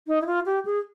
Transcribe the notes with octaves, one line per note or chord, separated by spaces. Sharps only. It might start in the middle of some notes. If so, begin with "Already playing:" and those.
D#4
E4
F4
G4
G#4